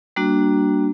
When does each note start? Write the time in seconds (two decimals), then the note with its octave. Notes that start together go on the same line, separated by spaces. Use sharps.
0.16 G3 A#3 D4 F#4